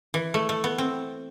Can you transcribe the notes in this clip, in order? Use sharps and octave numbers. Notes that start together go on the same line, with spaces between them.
E3
A3
A3
B3
C4